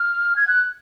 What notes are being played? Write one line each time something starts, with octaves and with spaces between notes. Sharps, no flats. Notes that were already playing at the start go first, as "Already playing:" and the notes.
Already playing: F6
G#6
F#6